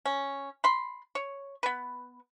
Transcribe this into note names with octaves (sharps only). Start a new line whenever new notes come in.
C#4
B5 C6
C#5
B3 B4